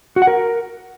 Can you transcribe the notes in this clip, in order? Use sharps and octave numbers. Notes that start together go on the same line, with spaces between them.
F#4
F#5
A#4